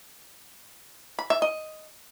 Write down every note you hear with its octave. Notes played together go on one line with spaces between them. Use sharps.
B5
E5
D#5